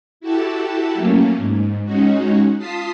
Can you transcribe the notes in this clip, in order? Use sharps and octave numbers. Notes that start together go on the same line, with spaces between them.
E4 F#4 G4 A4 A5
F#3 A3 A#3 C#4
G#2
G#3 C#4 D#4 F#4
F4 A5 D#6 B6 C7